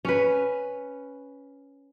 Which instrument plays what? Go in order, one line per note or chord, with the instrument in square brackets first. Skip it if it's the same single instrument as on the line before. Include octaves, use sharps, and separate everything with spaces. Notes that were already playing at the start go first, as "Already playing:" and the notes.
[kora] C#4 B4